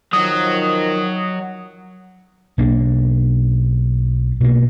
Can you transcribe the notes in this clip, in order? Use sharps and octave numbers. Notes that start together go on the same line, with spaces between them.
D#3 F3 F#3 D#6
B1 A#3 D4
B2 A#3